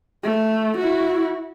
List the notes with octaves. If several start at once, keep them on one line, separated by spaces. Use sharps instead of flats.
A3
E4 F#4